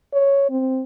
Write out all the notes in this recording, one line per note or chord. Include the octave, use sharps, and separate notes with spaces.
C#5
C4